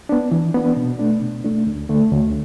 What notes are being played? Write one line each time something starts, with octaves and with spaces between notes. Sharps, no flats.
B3 D4
E3
B3 D4
B2
A3 D4
B2
A3 D4
D2
D3 A3
D2